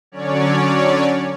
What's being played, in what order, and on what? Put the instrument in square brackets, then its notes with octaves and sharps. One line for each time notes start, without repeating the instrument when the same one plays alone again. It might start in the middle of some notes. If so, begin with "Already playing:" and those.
[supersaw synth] D3 F#3 C#4 C#5 D5